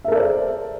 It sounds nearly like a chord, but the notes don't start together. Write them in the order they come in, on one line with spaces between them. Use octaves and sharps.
E5 A#4 A4 D5 C5